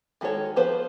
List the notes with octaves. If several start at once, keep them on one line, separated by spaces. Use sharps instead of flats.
D#3 G#3 F#4 A4 C#5
F3 B3 B4 C5